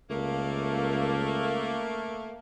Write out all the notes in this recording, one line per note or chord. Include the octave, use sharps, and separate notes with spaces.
C#2 A3 A#3